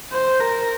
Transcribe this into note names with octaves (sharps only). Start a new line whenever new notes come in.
C5
A#4